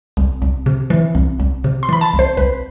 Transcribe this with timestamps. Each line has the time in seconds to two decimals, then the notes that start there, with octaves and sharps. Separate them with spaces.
0.17 C2
0.42 C2
0.66 C3
0.90 E3
1.15 C2
1.40 C2
1.64 C3
1.83 C6
1.89 E3 B5
2.01 A5
2.14 C2
2.19 C5
2.37 C2 B4